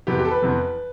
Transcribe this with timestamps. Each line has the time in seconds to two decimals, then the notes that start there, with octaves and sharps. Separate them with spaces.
0.07 F2 C3 E3 B3 G4
0.19 G4
0.25 A4
0.31 B4
0.42 F2 C3 E3 B3